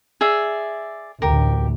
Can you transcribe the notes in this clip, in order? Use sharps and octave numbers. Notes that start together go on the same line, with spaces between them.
G#4 D5 E5
A1 D2 G4 A#4